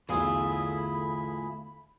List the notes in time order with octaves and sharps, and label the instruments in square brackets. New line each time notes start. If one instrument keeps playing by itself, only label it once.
[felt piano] B1 E2 [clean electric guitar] A2 G#4 [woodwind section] D3 B5 [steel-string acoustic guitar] E4 F4